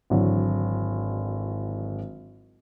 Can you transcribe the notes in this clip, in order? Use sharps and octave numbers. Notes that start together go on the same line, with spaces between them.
G#1 D3 E3 F#3